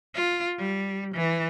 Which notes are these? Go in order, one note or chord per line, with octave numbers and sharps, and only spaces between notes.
F4
G3
E3